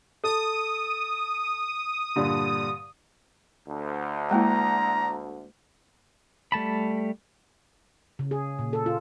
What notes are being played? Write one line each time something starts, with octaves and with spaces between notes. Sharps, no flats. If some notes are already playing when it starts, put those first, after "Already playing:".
A4 D#6
G2 A#2 D3
D2
G#3 A#3 E4 A#5
G3 A3 A5 B5
C#3
G#4
A#2
A4
F4